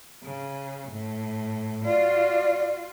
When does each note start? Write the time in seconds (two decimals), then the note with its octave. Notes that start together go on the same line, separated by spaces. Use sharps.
0.23 C#3
0.92 A2
1.85 F4 F#4 D5